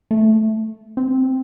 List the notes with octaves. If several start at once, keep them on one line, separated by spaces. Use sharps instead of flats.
A3
C4